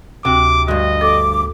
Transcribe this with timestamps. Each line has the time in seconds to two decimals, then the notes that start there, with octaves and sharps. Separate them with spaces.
0.25 D2 C3 F#4 G5 D6
0.68 D2 G2 F#4 D#5
1.01 A4 D6